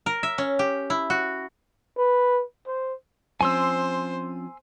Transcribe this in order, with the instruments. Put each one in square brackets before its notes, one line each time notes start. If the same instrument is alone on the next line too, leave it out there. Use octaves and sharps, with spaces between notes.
[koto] A#4
E5
C#4
G4
E4
F#4
[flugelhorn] B4
C5
[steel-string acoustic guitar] F3 C4 C#4 [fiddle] C5 [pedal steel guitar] G#5 C6 E6